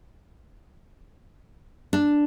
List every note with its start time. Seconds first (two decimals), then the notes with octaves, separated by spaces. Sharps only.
1.93 D4